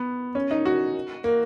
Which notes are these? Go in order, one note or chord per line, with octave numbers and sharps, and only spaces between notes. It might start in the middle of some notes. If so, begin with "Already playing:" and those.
Already playing: B3
C#4
D#4
F#4
A#3